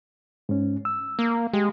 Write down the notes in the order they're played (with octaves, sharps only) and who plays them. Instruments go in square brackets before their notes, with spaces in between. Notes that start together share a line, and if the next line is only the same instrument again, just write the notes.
[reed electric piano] G#2 C#4
E6
[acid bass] A#3
[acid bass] G#3 [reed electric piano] G4